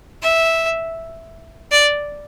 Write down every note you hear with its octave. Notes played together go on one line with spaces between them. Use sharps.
E5
D5